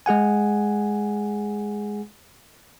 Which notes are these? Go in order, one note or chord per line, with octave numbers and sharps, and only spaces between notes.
G#3 G#4 F#5 G#5